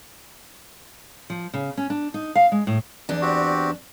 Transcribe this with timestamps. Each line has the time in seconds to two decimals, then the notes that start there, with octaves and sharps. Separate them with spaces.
1.30 F3
1.54 C#3
1.77 C#4
1.90 D4
2.14 D#4
2.35 F5
2.52 G#3
2.67 A2
3.09 E2 D4
3.21 C4 F#4 G4